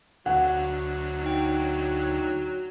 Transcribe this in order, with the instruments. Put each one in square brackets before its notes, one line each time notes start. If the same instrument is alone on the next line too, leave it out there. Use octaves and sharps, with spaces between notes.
[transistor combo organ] D2 [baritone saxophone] F#3 [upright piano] F#5
[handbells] D#4 G5